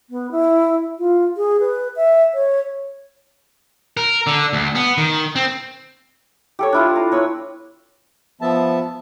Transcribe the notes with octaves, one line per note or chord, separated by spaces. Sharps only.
B3
E4
F4
G#4
B4
E5
C#5
A#4
D3
D2
B3
D#3
C4
G4 A4 C#5
D4 E4 F4
A#5
B4 C#5 E6
F3 B3 E5 A5